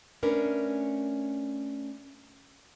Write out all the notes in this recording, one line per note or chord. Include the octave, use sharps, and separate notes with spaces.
A3 C#4 D4 A#4 B4